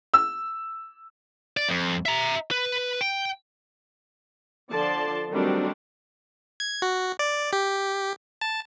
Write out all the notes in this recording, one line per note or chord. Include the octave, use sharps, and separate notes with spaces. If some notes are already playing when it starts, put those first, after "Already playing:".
E6
D5
F2
E5 A#5
B4
G5
D3 F3 D5 A5 C6
D#3 F#3 G3 A3 C4 D4
G#6
F#4
D5
G4
A5